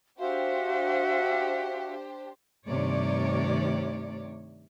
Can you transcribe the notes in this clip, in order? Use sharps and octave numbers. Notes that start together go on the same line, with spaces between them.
D4 F#4 G4 C5 E5 F5
G2 C3 D#3 A3 C#5 D5